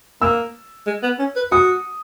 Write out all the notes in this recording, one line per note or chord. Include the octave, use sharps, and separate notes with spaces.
A#3 E6
G#3
B3
C#4
B4
F#4 D#6